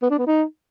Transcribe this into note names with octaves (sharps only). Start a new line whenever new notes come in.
B3
D4
B3
D#4